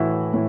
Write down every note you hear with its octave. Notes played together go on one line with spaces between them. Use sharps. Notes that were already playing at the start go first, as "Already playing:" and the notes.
Already playing: A2 E3 E4 F#4
A2